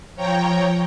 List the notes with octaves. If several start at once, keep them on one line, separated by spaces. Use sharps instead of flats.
F3 C#5 G5 A#5